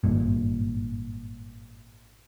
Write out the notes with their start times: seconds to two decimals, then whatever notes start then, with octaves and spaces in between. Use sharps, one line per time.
0.04 G#1 G2 A#2